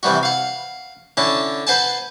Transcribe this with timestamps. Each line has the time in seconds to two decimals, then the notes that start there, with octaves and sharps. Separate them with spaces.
0.03 C3 E3 G3 F#4
0.23 F5 F#5
1.17 D3 C#4 E4 A5
1.67 B4 C5 F#5 G#5 A5